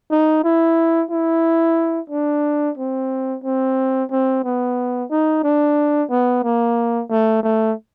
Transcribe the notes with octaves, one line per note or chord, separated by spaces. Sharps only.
D#4
E4
E4
D4
C4
C4
C4
B3
D#4
D4
B3
A#3
A3
A3